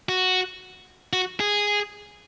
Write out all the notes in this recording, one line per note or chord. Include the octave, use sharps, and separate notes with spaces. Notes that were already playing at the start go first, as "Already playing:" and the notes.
F#4
F#4
G#4